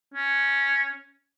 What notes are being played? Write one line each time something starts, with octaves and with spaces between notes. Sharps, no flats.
C#4